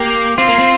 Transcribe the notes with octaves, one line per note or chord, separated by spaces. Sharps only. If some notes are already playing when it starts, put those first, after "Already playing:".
Already playing: A#3 G4
C4 F4
A#3
C4